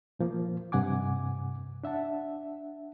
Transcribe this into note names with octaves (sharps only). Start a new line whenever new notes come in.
A#2 F3 A#3
G2 C3 F#5 G#5 D6
D4 E5 F#5 A5